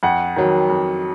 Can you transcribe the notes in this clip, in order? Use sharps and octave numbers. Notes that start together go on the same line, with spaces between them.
F2 F#5
D#3 F#3
F2